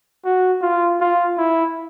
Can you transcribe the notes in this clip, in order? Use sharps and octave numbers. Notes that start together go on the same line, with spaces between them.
F#4
F4
F4
E4